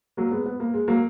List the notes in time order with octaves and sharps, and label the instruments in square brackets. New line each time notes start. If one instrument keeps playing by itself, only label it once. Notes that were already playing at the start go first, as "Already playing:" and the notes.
[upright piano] F#3 A#3
G#3 B3
B3
A#3
G#3
F#3 A#3